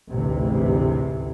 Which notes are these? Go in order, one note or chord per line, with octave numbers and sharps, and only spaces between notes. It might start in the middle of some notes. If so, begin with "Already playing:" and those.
A1 D2 G#2 C3 E3